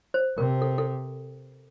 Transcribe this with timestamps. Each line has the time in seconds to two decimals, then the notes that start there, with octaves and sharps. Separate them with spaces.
0.14 C5
0.38 C3 A#4
0.62 A4
0.78 A4